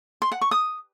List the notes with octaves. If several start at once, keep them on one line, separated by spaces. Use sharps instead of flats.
C6
F#5
C#6
D#6